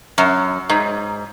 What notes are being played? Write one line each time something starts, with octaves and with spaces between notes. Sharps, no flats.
F#2
G#2